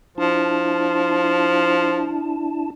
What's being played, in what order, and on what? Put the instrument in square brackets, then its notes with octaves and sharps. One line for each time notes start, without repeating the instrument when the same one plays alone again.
[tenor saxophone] F3 [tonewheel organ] D4 E4 A5